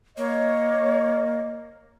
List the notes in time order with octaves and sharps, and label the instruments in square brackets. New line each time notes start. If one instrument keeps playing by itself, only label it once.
[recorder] A#3 [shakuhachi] C#5 [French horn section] D#5